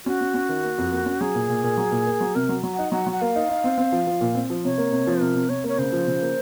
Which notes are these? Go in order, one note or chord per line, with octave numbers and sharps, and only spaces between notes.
C#4 F#4
C#4
C#4
D#3
A#3
F2
A#3
C#4
F#3 G#4
A#2
A#2
A#2
F#3
A#2
A#3
F#3
C3 A#4
F#3
F#3
F#5
D#4
F#3 F#5
F#3
F#5
A#3 F5
D#4
D#4
C4
C4
F3
F3
A#2
C4
F3
C3 C#5
A#3
C3
F3
C3 A#4
C3
C3 C#5
A#3 C#5
C#3 C5
F3
C#3
A#3